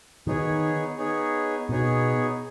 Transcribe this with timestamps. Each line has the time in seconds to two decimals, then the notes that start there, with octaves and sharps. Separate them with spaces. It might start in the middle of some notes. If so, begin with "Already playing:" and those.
0.27 D#3 B3 D#4 G#4 C#5
0.98 B3 D#4 G#4 C#5
1.69 B2 B3 D#4 G#4 C#5